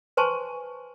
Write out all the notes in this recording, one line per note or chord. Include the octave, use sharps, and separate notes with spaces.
B4 C5 G#5 A5 C6 C#6